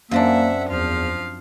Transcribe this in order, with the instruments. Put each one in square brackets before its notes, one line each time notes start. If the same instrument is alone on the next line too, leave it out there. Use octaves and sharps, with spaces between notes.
[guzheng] F#2 C4 D4 [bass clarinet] A#3 [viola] E5 F#5
[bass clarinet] E2 [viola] F3 F5